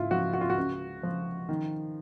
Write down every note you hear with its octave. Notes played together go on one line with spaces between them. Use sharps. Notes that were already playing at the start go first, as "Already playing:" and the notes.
Already playing: G#2 E4 F4
F3 F#4
F#4
F4
F#4
C#2
F3
D#3